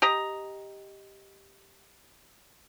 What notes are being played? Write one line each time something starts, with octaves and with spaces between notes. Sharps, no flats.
G4 D#5 A#5